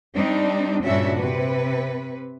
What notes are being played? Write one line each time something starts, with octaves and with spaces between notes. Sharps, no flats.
G3 C4 D4 D#4
G2 A#2 C#3 D4 F#4 E5
C3 B4